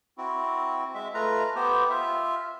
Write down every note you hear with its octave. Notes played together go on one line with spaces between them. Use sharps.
C4 E4 F#4
G#3 E5
A3 F4 B4 A#5
B3 G4 C5
F4 E5